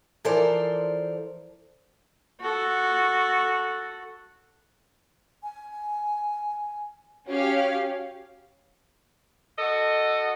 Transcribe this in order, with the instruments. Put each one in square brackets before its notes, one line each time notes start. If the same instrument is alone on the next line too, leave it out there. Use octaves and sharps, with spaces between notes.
[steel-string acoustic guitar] E3 F3 A4 A#4 C5 D5
[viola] F#4 A4
[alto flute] G#5
[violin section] C#4 G4 F5 [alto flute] F#4
[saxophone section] F#4 A4 D#5